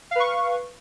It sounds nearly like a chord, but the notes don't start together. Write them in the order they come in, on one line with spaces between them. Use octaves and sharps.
F5 B4 C#6